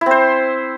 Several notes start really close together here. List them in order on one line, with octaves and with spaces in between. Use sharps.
E4 C4 C5